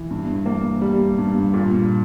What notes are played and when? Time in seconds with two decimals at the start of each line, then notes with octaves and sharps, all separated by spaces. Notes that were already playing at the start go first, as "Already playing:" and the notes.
Already playing: E3
0.11 G2
0.46 A#3
0.81 G3
1.18 G2
1.54 A#2